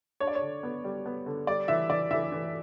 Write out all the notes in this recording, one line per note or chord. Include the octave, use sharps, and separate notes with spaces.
D4 C#5
D5
C#5
D3
B3
G3
B3
D3
G3 D5
E3 E5
E3 D5
E3 E5
E3